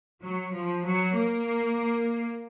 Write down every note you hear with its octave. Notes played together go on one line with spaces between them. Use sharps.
F#3
F3
F#3
A#3